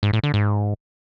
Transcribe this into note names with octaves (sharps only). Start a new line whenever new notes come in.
G#2
A2
D3
G#2